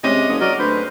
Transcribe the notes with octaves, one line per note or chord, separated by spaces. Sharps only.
C3 G#3 C#4 D#5
F#1 D#6
F#3 A#4 D5 D#5
D2 B4 C5